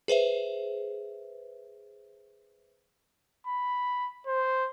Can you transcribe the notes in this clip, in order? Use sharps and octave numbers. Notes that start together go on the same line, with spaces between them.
G#4 B4 C5 E5
B5
C5